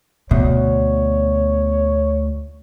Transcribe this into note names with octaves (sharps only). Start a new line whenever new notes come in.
D2 B2 C#5